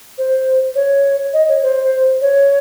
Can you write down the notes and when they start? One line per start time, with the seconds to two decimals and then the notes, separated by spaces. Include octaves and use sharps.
0.18 C5
0.75 C#5
1.33 D#5
1.49 C#5
1.63 C5
2.21 C#5